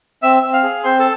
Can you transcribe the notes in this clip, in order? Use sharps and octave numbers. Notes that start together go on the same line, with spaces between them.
C4 E5 E6
C4
F5 F6
G#4
C4 C5 C6
A4 A5